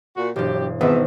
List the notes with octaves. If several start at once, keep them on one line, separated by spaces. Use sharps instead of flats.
A#2 F#4
E1 G2 F#3 G4
G#1 F2 G#3 B3 E5